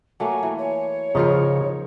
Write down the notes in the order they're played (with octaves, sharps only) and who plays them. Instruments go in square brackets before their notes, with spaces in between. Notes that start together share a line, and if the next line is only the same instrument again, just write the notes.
[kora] F#3 A3 A#3 [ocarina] G#5
[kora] E3
[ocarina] C#5
[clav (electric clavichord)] C#3 F3 [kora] D#4 F4 A#4